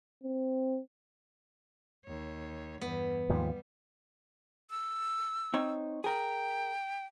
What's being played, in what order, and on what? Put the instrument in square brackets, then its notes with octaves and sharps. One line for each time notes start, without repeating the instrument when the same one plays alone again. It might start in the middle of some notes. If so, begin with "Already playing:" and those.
[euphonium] C4
[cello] D#2 C#5
[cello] E2 G2 [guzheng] B3
[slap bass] D#2 G#2 F3 [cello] G3
[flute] E6
[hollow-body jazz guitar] C4 D#4 C#5
[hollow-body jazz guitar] G#4 A#4 [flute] G5